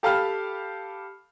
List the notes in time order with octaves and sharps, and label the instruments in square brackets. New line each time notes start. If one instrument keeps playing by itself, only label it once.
[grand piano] G4 A4 F5 A5 B5 F6